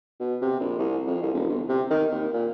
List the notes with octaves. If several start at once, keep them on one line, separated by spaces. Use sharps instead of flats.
B2
C3
A#1
C2
F2
C2
E1
G1
C3
D#3
D#2
A#2